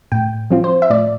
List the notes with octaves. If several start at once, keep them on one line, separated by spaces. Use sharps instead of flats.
A2 G5
F3 C4 F4
C5
E5
A2 D5